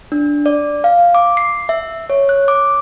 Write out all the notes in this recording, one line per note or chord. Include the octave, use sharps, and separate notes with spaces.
D4
D5
F5
D6
C7
E5
C#5
F#6
D6